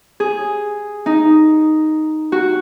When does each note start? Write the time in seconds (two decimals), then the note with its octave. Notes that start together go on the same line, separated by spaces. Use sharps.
0.20 G#4
1.06 D#4
2.32 F#4